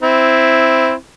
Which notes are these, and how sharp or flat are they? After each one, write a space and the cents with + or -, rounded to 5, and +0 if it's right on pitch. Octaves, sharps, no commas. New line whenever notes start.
C4 +0 E4 +0